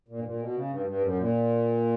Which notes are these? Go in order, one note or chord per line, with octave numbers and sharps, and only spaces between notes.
A#2
G2
A#2
B2
C#3
G2
G2
F#2
A#2